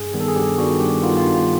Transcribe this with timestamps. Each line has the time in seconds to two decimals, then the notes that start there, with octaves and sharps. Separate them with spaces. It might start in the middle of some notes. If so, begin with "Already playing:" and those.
Already playing: G2 G#4
0.14 D#3 G3 B3
0.20 A4
0.28 G#4
0.35 G2 G4
0.58 D#3 G3 B3 F#4
0.80 G2 G4
1.03 D#3 G3 B3 F4
1.17 F4
1.25 G2